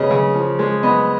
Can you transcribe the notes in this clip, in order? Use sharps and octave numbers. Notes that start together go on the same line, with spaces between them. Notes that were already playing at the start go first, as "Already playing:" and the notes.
Already playing: C#3 F#3 B3 C#5 D#5
C#3
F3
G#3
B3 D#5